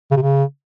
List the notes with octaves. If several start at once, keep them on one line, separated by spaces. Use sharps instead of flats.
C#3
C3
C#3